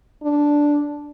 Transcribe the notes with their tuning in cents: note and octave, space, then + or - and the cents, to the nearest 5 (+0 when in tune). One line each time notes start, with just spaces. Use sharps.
D4 -5